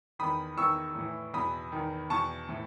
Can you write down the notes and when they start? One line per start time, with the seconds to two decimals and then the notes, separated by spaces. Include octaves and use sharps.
0.19 E2 D#3 B5 D#6
0.57 E2 D#3 C#6 E6
0.95 A2 E3
1.34 E2 B2 B5 D#6
1.72 E2 D#3
2.10 E2 B2 A5 C#6
2.49 A2 E3